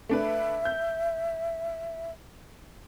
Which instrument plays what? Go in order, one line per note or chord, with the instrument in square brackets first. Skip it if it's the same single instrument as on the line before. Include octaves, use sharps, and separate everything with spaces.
[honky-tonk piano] A3 D4 B4 [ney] E5
[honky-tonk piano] G6